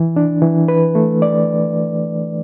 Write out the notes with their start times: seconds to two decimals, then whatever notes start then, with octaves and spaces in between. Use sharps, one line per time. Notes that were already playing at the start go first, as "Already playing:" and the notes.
Already playing: E3
0.16 D4
0.42 E3
0.68 B4
0.95 A3
1.22 D5